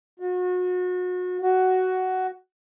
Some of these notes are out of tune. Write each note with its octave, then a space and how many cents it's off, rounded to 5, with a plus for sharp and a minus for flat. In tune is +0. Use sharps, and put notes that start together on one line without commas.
F#4 -35
F#4 +10